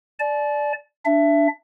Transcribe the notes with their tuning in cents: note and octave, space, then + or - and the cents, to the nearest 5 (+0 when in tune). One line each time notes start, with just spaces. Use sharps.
D5 +0 A5 -45
D4 +0 E5 +20